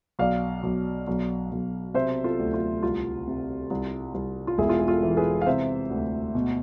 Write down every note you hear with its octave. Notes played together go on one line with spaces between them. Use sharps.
B1 D5 F5
B1
B1
B1
C3 C5 E5
F4 A4
D2
F4
C2 F4
C3
C2
C2
F4
E1 E4 G#4
F4
G#4
F4 A4
E3
G#4 B4
F5
C3 C5 E5
D2
B2